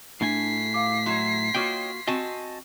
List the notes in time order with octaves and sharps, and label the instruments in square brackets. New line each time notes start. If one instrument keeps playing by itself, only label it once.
[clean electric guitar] A2 A3 G#5 [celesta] D4 [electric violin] B6 C7
[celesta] F5 D6
[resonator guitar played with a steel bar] F#3 E4 [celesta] C6 G#6
[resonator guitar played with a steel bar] A#3 F4 F#4 [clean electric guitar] C#5 D#5 G5
[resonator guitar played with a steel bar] C4 F#4 [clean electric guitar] D#5 G#5 A5